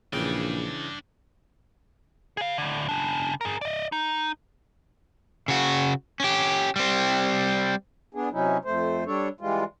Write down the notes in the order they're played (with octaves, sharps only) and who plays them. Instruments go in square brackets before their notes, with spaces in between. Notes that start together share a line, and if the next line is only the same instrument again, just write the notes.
[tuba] A#1 [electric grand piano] C#3 E3 [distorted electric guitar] D4 G5
[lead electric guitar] G#4 F5
A2 D3
C#3 D4
G#4 A#4
D5 D#5
D#4
[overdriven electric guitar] C#3 F#4
C#4 G4
G3 C4
[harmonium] B3 D4 G#4
C3 F#3 C#4 D#4 E4
F2 A3 C5
G3 D4 A4 C#5
E3 G3 G#3 F4